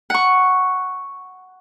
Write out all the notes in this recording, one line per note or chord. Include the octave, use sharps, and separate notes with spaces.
F#5 C#6